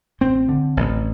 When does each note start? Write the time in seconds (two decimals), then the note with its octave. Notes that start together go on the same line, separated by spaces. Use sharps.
0.21 A1 C4
0.49 D3
0.77 A1